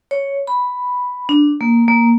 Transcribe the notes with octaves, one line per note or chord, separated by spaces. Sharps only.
C#5
B5
D4
A#3
A#3